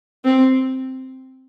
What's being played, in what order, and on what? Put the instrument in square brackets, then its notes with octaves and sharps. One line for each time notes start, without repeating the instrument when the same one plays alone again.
[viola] C4